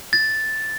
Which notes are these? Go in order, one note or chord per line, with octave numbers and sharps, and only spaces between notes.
A6